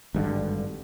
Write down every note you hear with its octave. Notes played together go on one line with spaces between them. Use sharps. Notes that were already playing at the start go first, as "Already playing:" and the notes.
G#1 G2 A#2 D3